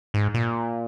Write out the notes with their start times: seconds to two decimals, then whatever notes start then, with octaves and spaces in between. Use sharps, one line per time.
0.14 G#2
0.34 A#2